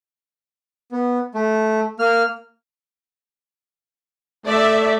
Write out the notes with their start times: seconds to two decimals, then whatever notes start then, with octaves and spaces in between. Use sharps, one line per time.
0.92 B3
1.34 A3
1.99 A#3 F6
4.46 A3 D5 E5